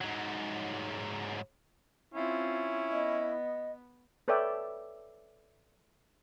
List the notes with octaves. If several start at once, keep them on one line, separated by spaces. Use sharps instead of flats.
G#2 F#3
C4 C#4 E4 F4
B3 D#5
A4 B4 C#5 D5 E5 G5